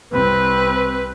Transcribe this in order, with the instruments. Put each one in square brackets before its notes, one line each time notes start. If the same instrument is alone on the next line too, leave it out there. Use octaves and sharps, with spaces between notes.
[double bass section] C2 C4 [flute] B4